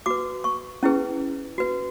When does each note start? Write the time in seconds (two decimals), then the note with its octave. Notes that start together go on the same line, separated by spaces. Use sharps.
0.06 F#4 B4 D6
0.44 C#6
0.83 C#4 E4 G#4 B4
1.58 F#4 B4